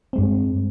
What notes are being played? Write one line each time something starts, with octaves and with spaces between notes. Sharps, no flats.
G2 G#3 C4